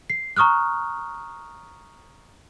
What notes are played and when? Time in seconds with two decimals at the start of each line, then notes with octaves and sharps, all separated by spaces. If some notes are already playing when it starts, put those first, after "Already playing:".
0.10 C7
0.36 A#5 C#6 D#6 F6 F#6